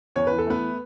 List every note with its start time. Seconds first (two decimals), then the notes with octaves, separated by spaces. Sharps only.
0.16 E2 C#5
0.27 E3 B4
0.38 A4
0.47 A3 B3 B4